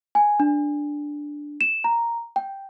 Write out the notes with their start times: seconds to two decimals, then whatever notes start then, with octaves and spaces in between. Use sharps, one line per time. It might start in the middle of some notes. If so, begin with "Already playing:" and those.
0.15 G#5
0.40 D4
1.61 E7
1.84 A#5
2.36 G5